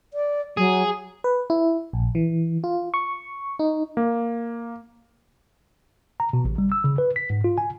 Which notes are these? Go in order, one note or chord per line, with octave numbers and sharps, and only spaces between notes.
D5
F#3 G#4
B4
E4
A#1
E3
F4
C#6
D#4
A#3
A#5
B2
A1
G3
E6
C#3
B4
B6
G#2
F4
G#5